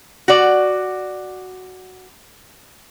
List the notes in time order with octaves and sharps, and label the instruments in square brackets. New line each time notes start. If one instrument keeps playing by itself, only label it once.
[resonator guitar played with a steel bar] F#4 D5